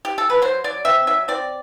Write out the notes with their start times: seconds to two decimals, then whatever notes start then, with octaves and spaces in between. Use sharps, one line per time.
0.05 G4
0.18 A4
0.30 B4
0.42 F#3 C5
0.64 F#3 D5
0.85 C4 E5
1.07 F#3 E5
1.28 C4 D5